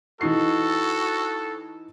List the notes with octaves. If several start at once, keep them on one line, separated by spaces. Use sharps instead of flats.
E3 D#4 F#4 A4 C7